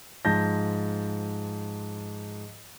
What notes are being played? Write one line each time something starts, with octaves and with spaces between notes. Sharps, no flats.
G#2 F3 A5 G6 A#6